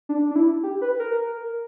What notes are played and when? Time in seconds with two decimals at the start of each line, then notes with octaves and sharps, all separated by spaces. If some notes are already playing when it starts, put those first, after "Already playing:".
0.09 D4
0.31 D4
0.36 E4
0.63 G4
0.82 B4
0.99 A#4